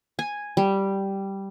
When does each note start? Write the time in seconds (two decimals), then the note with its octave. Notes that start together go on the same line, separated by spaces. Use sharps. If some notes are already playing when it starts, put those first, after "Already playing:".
0.19 G#5
0.57 G3